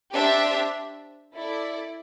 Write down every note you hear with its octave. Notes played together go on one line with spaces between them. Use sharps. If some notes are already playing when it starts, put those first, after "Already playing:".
D4 G4 C5 E5
E4 A4 D5